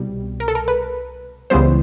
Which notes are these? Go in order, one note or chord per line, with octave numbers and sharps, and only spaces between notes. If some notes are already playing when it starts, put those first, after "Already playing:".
Already playing: C2 B2 G3
A#4
A4
A#4
B4
C#2 C#3 E3 G3 B3 C5